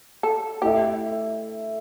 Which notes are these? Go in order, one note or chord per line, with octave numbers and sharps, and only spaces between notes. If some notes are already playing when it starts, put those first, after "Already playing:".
A4
A3 E4 G4 A4 E5